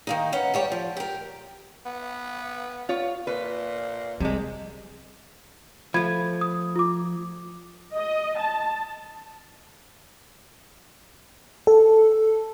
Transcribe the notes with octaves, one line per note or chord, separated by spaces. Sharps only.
D#3 A#3 D#4
B3 C#4 F#5
G3 G4 C#5
F3
G4 A#4
B3
F4 C#5
A#2 B4
C3 G3 G#3
F3 A3 B5 G#6
D#6
F4 D6
D#5
A5
A4